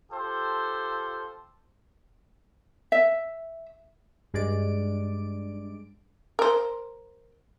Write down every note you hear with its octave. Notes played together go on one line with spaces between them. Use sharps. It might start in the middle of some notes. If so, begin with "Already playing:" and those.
F4 G4 A4 C5
E5
G2 G#3 D5 D7
A#4 C5